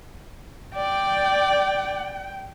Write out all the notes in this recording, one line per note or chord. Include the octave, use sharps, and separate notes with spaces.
D5 G5